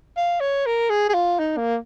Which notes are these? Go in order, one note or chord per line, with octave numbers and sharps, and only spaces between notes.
F5
C#5
A#4
G#4
G#4
F4
D#4
A#3